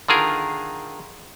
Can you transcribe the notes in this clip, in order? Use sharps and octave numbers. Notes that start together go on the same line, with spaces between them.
D3 D#3 F4 G#4 A#4